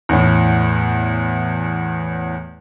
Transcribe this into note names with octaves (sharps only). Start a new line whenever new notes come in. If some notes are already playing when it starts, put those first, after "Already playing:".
E2 A2